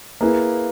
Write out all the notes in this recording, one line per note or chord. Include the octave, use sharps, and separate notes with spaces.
A#3 E4 G#4 B4